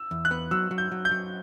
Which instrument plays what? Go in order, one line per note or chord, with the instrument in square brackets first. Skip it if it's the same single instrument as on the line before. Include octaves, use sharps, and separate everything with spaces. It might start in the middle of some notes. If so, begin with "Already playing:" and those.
Already playing: [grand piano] E6
[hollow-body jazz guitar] E2
[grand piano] F#6
[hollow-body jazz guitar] B3
[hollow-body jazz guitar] F#3 [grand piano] E6
[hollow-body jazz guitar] F#3
[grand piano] G6
[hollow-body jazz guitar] F#3
[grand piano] G6
[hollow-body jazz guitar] F#3